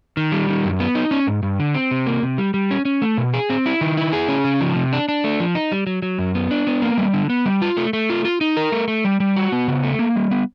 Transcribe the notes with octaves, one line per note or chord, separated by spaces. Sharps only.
D#3
G3
D#3
F#2
B3
D#4
C#4
G#2
G2
D3
C4
C3
A#3
C3
G3
G3
C#4
C#4
A3
B2
G#4
C4
E4
D#3
E4
G#4
C#4
C#3
F3
C3
D4
D4
A3
F3
D#4
G3
F#3
F#3
F#2
B3
D4
B3
A#3
G3
D3
B3
G3
F4
A3
A3
F4
F4
D#4
A#4
A3
A3
G3
G3
F#4
B3
C#3
A3
A#3
G3
B3